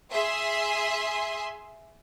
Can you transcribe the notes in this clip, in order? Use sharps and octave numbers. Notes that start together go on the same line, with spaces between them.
G#4 E5 G#5 C6